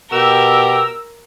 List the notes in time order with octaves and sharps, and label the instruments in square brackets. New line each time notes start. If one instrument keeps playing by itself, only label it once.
[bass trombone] B2 [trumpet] G4 [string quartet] A#4 [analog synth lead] E6